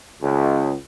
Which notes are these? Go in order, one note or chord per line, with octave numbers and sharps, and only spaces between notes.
C#2